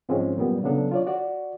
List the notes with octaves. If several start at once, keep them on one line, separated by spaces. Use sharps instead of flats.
G#2 F3 G#3 C4 C#4
F#2 A#2 G3 B3
C#3 F#3 B3 D4 A4
F4 C#5 D5
F#4 D5